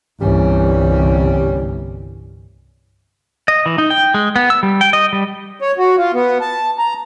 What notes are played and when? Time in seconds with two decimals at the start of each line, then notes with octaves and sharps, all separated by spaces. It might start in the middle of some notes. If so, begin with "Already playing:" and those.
0.20 G1 C2 E3 G3 C#4
3.48 D#5
3.66 E3
3.78 D#4
3.90 G5
4.14 G#3
4.36 B3
4.50 E6
4.63 G3
4.81 G5
4.93 D#5
5.13 G3
5.60 C#5
5.78 F#4
5.97 F4
6.14 B3
6.41 A5
6.79 A#5